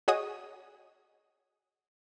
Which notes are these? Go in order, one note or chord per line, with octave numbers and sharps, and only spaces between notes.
F#4 G#4 C#5 D#5 F#5 D#6